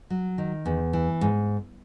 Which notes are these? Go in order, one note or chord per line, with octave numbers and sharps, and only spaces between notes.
F#3
D#3
E2
E3
G#2